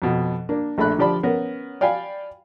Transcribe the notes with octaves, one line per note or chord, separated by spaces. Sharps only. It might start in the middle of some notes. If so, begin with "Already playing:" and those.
F2 B2
A#3 D4
A#1 A3 D4 B5 F#6
D3 F3 G4 D5 A5 B5
B3 C#4 A#4
D5 F5 G5 G#5 B5